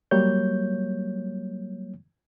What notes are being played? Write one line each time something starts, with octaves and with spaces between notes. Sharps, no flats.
F#3 G3 A#3 C#5 G6